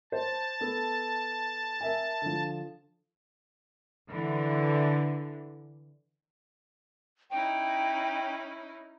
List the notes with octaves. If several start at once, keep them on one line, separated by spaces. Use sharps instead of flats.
C5 A5
B3 A4
A#4 E5 G#5
D3 F3
D3 E3
C#4 D#4 E4 G5